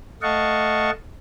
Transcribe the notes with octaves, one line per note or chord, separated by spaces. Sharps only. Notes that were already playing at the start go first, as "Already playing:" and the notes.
A3 D#5 F5 F#5 A5 C#6